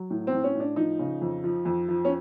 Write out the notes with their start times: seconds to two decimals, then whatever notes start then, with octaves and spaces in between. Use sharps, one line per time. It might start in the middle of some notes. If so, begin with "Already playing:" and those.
Already playing: F#3
0.10 A2
0.27 C4
0.33 A2
0.44 C#4
0.55 A2 D4
0.76 F3 D#4
0.99 C#3
1.21 F2
1.44 F3
1.65 F2
1.88 F3
2.05 C#4